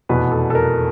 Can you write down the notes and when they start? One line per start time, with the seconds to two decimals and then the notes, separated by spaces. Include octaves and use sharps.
0.09 F1 E2 B2 B4
0.31 A4
0.50 A4
0.55 A#4